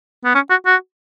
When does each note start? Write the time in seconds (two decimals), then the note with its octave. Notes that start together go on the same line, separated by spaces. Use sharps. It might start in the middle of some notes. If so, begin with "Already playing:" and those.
0.24 B3
0.34 C#4
0.50 F#4
0.66 F#4